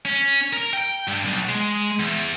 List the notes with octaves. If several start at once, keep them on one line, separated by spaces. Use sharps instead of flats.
C#4
A#4
G5
G2
B1
G#3
E2